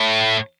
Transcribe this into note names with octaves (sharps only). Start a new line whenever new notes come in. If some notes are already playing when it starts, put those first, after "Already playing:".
Already playing: A2